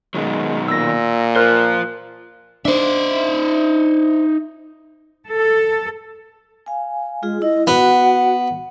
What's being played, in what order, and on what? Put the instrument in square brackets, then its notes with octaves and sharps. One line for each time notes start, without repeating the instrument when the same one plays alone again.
[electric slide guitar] B2 D#3 F#3 [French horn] G#3
[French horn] A#2 [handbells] E6 A#6
[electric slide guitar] F4 C5 [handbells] A#4 F#6
[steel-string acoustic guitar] D4 C5 [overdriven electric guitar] D#4 E5
[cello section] A4
[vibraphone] F5 G#5
[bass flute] G#3 [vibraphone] F4 G#4
[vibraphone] E4 [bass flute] D#5
[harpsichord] B3 [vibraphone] F#4 [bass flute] F#5